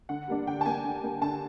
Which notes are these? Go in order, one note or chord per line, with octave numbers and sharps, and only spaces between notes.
D3 F#5
G3 A#3 D4
D3 G5
A5
G3 A#3 D4 G#5
D3
G3 A#3 D4
D3 A5